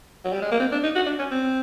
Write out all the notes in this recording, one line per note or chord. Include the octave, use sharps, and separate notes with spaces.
F#3
G3
G#3
A#3
C4
D4
D#4
F#4
D4
C#4
C4